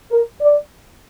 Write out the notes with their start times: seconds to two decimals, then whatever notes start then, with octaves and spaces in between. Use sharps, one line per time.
0.11 A#4
0.41 D5